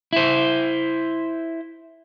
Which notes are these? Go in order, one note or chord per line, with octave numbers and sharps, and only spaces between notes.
E4 C5